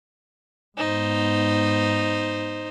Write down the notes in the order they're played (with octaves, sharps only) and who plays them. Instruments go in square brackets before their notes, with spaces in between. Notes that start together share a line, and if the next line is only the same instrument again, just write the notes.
[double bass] G#2 B3 [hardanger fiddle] D#4 C5